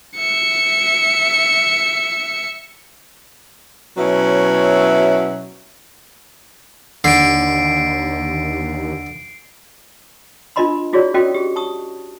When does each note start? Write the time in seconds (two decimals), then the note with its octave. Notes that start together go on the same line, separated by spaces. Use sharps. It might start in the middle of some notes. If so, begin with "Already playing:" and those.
0.17 E5 C#7
3.97 B2 F#3 B3 C#4 E4 E5
7.04 D#2 D3 C7 D7
10.56 D4 F4 A#4 D#5 B5 C6
10.93 E4 F#4 G#4 C#5 D5
11.14 C#4 F#4 A4 A#4 D#5 G5
11.34 G4 G#4
11.56 A5 C#6 D#6